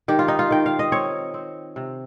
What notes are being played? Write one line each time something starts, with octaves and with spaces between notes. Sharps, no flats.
D#3 G4
F4
D#4
F4
D#3 G5
F5
D#5
C4 C#5
C4
C3